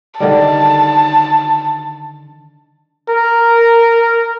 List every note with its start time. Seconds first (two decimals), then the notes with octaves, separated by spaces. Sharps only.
0.20 D3 D#3 G3 A5
3.10 A#4